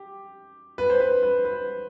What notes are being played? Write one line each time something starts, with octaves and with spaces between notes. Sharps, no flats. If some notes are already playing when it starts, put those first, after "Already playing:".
Already playing: G4
B4
C5
B4
B4
B4